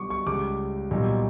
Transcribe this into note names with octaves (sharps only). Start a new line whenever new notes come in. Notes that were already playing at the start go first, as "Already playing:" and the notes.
Already playing: B1 B2 G3 C#6 D6
C#6
C#2 C#3 G3 D6
B1 A#2 G3